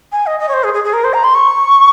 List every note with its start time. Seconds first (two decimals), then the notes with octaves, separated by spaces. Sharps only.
0.12 G#5
0.26 D#5
0.40 D#5
0.49 C#5
0.53 C5
0.64 G#4
0.74 G#4
0.84 G#4
0.93 A#4
1.04 C5
1.13 A#5
1.24 C6
1.35 C#6